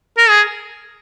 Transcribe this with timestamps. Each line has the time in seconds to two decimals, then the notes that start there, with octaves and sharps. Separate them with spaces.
0.18 A#4
0.29 G#4